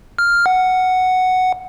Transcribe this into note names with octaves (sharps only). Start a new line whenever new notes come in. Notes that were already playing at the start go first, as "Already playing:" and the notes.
F6
F#5